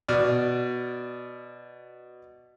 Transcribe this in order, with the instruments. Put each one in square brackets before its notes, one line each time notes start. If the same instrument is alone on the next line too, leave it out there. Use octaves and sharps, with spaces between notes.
[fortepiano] B2 D5 F6